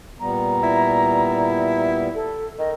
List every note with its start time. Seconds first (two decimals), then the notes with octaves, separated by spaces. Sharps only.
0.20 A#2 G3 B3 A#5
0.63 E4
2.15 A4
2.59 D#3 D#5